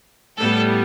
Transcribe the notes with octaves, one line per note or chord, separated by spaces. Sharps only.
A2 G3 B3 A4